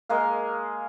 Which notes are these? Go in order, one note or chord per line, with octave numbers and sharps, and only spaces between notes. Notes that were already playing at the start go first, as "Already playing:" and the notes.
G#3 A#3 F5